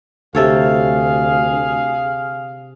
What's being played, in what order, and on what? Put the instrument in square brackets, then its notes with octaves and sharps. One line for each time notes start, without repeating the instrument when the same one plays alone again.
[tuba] D2 [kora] C3 A4 C#5 [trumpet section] G#4 F5